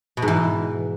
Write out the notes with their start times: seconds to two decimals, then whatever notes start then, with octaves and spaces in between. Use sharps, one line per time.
0.17 B2
0.22 G#2
0.28 E3